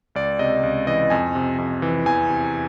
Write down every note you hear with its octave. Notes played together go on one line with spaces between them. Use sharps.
C#2 D5
C3 D#5
C#2
E3 D#5
F2 G#5
C3
F2
E3
E2 G#5
C3